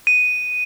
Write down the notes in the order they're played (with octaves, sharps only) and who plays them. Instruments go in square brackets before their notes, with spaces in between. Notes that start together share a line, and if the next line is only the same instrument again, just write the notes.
[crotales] D#7